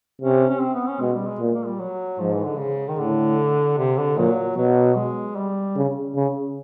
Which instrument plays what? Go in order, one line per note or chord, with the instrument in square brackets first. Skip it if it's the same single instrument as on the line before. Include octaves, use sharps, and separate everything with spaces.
[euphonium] C3 [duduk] C#4
[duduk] C#4
C4
B3
C#4
[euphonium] B2 [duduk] G#3
[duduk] G3
G#3
[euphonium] A#2
[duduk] A#3
G3
F#3
[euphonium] G#2 [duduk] F3
[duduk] E3
D3
C#3
D#3
[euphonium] A2 [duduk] D3
[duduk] C3
D3
[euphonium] A#2 [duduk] F#3
[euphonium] B2 [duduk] F#3
[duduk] G#3
G3
[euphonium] C#3
C#3